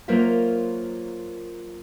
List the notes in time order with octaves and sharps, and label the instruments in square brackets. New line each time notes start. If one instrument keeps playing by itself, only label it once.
[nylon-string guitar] F#3 A#3 F4 A#4 C5 E5